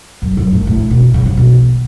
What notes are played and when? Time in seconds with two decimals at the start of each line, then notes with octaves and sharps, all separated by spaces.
0.22 F#2
0.37 F#2
0.53 A2
0.67 A2
0.91 B2
1.14 C#3
1.26 C#3
1.37 B2